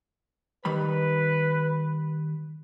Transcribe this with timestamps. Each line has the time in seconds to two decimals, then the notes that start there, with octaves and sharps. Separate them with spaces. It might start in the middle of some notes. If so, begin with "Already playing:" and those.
0.65 D#3 G3 B4 B5